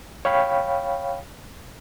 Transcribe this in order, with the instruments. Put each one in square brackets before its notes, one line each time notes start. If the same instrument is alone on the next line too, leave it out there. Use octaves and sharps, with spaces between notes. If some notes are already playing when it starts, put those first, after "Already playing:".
[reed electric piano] C#5 F5 G5 B5